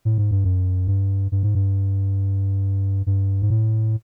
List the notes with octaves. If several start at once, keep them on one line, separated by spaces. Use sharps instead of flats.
A2
G#2
G2
F#2
G2
G2
G#2
G2
G2
G#2
A2